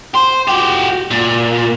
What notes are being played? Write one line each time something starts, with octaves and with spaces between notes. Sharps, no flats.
C5
F#4 G4
A#2